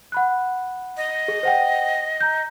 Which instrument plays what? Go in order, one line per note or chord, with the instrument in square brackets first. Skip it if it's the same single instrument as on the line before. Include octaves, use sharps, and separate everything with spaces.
[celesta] F#5 B5 F#6
[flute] D#5
[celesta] G#4
C5 F#5 G5
A#5 G6